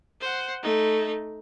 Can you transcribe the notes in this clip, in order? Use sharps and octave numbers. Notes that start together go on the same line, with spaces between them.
C5 F#5
A3 D#4